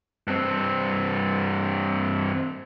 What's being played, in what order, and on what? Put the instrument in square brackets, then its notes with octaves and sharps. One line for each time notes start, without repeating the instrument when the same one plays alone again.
[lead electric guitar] G2 C4